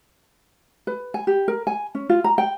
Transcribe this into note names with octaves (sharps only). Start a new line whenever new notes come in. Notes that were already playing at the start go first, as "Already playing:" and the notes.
B4
G#5
G4
A#4
G#5
C#4
F4
A#5
G5